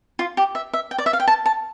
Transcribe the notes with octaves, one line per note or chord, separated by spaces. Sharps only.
F4
G4
E5
E5
G5
D5
E5
F5
G5
A5
A5